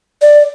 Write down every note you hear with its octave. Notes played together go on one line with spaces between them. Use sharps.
D5